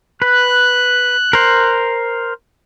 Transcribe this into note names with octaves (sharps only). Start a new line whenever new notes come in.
B4 F#6
A#4 C5